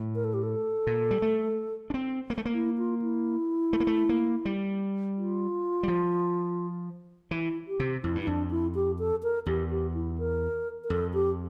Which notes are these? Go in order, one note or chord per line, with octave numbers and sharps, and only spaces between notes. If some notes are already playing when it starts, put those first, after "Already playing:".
Already playing: A2
A#4
A4
G4
A4
A#2
G3
A3
D4
C4
A#3
A3
A#3
E4
F4
E4
A3
A#3
A3
A#3
G3
F4
G3
F3
E3 E4
G4
C3
F2 E4
G2
E4
F2 D4
E4
G4
A4
A#4
E2 G4
G4
E4
A#4
A#4
F2 A4
G4